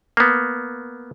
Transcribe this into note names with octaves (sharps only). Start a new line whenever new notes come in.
A#3 B3